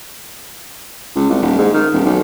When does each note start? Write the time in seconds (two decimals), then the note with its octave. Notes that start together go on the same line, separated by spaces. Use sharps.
1.16 C#2
1.30 C2
1.42 D#1
1.58 G#2
1.74 D#3
1.93 D#1
2.05 B1